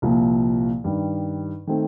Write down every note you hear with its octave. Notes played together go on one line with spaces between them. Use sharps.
C2 A#2 F3
G2 D#3 G3
D#3 A3 C4